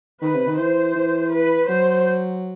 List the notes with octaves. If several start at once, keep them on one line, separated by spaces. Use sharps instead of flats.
D#3 B4
C3
D#3
E3 C5
E3
B4
F#3 C5